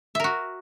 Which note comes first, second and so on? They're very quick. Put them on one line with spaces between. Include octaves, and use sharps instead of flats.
E5 A#4 F#4